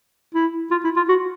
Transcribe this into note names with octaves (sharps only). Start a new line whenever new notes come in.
E4
F4
E4
F4
F#4